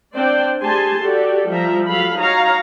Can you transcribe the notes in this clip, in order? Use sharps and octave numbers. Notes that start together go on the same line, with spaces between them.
C4 D4 C5 D5 G5
A3 G4 G#4 G#5 A5 C6
F#4 G4 A4 D5
F3 G3 E5 A#5
F#3 A4 F5 B5
D#4 F#4 C#5 F5 A#5